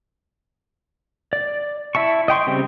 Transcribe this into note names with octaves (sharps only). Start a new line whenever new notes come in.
D5
E4 E5 A5 C#6
D#5 G5 C6 C#6
C#3 G3 C4